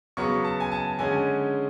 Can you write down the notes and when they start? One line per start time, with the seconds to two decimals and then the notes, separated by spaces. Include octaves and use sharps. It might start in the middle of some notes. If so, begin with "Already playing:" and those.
0.17 C#3 F#3 B3 C#6
0.44 A5
0.60 G#5
0.72 A5
0.99 D3 G#3 C#4 G#5